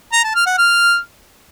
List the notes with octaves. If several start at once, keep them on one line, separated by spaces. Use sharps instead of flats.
A#5
A5
F6
F#5
F6